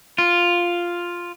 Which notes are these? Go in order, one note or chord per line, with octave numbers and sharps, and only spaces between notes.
F4